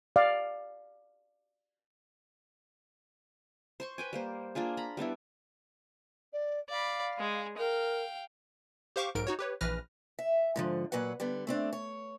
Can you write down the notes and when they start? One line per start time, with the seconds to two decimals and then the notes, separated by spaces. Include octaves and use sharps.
0.16 D5 F5
3.80 C5 C6 C#6
3.98 B4 G5 G#5
4.13 G3 A#3 C5
4.55 A#3 D4 F4 G#4
4.77 A#5 B5
4.97 G3 B3 D4 E4
6.32 D5
6.70 D5 F5 B5
7.19 G#3 G#4
7.58 A#4 F5 G5
8.96 G4 C5 F5 C#6 D6
9.15 B1 G#2 A#4 D7
9.27 D#4 F#4 C#5
9.39 G4 B4 C#5
9.61 A#1 E3 B4 F6 A#6
10.19 E5
10.56 G#2 D3 F3
10.92 A#2 F#3 B4 F#5
11.20 D3 G3 B3
11.47 A3 C4 D4
11.73 C#5